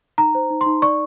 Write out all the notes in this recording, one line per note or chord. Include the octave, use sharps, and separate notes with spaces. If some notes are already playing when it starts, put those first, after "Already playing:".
D#4 A#5
C5
D#4
C6
D#4
D5 C#6